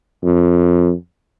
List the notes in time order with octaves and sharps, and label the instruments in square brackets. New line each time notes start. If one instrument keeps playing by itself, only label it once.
[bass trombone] F2